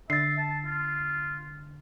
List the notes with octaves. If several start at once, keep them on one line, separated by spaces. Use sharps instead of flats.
D3 E5 A6 C7
A5
F4